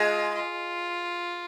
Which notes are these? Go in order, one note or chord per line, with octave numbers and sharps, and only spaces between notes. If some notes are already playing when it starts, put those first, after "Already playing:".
Already playing: G#3 F4
F4